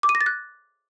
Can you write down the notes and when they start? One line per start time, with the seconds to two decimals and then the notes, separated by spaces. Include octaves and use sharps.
0.03 D6
0.09 D#7
0.15 A#6
0.21 A6
0.26 F#6